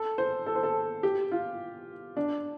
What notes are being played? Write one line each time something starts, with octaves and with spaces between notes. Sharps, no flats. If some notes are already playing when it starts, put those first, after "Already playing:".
Already playing: A4
C5
A4
C5
A4
G4
F4
D4